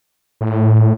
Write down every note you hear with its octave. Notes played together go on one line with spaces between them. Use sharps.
A2